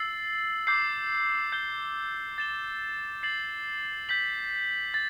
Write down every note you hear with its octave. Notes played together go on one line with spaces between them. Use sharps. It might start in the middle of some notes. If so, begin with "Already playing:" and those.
Already playing: E6 A6 C7 F#7
D6 G6 C7
G6 C7 G7
A6 E7 G7
A6 C7 F#7
G6 B6 F#7
A6